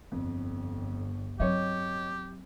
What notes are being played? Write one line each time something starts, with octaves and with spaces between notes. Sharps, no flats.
G1 F2
F#3 C4 G4 C#5 D#5